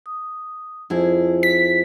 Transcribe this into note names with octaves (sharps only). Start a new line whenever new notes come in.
D#6
F2 E4 F4 G#4 C5
B6